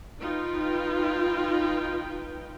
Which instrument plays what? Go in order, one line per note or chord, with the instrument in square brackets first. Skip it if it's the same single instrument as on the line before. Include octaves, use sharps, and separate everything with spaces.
[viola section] D#4 F4 B4 G5